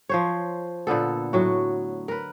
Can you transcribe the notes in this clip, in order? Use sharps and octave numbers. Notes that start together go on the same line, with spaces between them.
F3 C5 C#5
A#2 D3 B3 A4
A2 F#3 F#4
A#4 B4